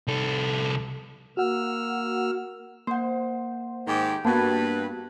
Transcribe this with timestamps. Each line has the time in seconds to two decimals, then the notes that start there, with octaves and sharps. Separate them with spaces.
0.07 C2 A4
1.37 A#3 F#4 F#5 E6 F6
2.87 A#3 C5 F#5
3.87 G#2 D#3 G4
4.25 G2 A#3 B3 F#4 B4 A5 G#6